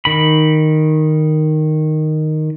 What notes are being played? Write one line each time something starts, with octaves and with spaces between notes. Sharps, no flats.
D#3 B5